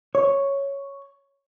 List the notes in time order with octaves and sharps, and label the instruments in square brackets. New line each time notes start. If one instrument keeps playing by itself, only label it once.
[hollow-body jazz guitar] C#5